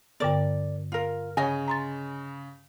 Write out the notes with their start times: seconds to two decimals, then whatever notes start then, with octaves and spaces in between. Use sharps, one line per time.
0.20 G2 D3 B3 A#4 D5
0.92 F4 A#4
1.37 C#3 C#5 D#5 G#5
1.68 A#5 C6 A6